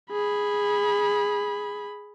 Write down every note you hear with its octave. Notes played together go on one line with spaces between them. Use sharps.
G#4 B5